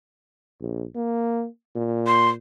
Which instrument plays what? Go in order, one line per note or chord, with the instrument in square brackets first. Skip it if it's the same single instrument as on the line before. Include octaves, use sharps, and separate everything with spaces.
[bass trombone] A#1
A#3
A#2
[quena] C6